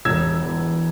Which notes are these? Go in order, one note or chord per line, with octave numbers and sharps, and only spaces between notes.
E1 E6 G#6
E2